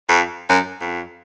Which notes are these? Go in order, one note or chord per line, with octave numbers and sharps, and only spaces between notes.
F2
F#2
F2